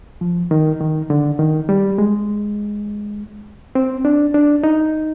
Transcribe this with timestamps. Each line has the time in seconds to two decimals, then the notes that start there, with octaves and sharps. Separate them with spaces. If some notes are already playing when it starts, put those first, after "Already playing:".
0.21 F3
0.51 D#3
0.81 D#3
1.10 D3
1.39 D#3
1.69 G3
1.98 G#3
3.75 C4
4.05 D4
4.34 D4
4.64 D#4